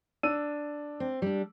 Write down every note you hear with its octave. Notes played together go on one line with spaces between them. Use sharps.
D4 E6 D#7
C4
G3 D4